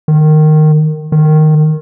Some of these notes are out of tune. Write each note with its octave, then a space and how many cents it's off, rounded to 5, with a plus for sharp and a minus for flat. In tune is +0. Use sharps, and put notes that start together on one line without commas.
D#3 -15
D#3 -10